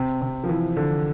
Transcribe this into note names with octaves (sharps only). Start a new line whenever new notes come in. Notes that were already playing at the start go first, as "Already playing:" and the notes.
Already playing: C3
C3
F3
E3
D3